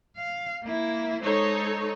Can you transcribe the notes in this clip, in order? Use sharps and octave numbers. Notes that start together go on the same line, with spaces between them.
F5
A#3 E4
G#3 D#4 A4 C5 C#5